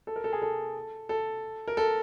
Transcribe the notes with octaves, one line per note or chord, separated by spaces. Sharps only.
A4
A#4
A4
G#4
A4
A4
A#4
A4